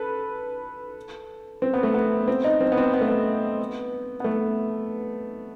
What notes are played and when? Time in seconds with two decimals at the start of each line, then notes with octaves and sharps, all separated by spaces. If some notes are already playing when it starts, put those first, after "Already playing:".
Already playing: A4 B4
1.62 C4
1.74 B3
1.83 A3
1.94 B3
2.28 C4
2.44 D#4
2.61 C4
2.72 B3
2.77 C4
2.94 B3
3.01 A3
3.09 B3
4.20 B3
4.24 A3